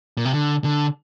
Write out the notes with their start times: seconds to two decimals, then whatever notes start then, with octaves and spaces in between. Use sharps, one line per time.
0.17 A#2
0.25 C3
0.33 D3
0.64 D3